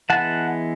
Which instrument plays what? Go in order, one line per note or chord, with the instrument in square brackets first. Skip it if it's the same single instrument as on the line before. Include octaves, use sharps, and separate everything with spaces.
[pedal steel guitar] E3 G#3 B3 F#5 A5